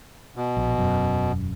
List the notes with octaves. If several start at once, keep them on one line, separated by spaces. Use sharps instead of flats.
B2
A#1
E1 F#2